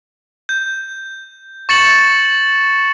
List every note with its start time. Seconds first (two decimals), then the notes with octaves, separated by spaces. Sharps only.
0.49 G6
1.69 C#6 A6 C#7 E7 F#7